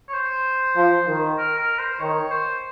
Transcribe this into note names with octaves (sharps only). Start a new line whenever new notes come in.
C#5
C5
F3
D#3
A#4
A#4
C5
D#3 C#5
C5